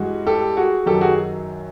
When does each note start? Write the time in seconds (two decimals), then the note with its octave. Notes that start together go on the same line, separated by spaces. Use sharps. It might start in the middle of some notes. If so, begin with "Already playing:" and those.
Already playing: G2 E3 G#3 F#4 G#4
0.27 G4 A4
0.57 F#4 G#4
0.86 F#2 D#3 F#3 G4 A4
1.01 F#4 G#4